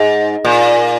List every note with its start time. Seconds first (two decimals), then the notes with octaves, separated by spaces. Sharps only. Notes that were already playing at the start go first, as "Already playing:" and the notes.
Already playing: G#2
0.45 A#2